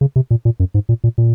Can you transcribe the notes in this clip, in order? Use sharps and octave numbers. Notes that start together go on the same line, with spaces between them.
C#3
C3
A#2
A#2
F#2
G#2
A#2
A#2
A#2